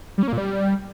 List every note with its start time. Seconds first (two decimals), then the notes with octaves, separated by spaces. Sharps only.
0.18 G3
0.23 C#4
0.28 A#3
0.33 A#2
0.38 G3